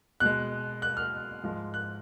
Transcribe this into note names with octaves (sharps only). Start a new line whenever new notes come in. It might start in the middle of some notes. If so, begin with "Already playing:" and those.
B2 G#3 F#6
F#6
F6
G#2 F3 G#3
F#6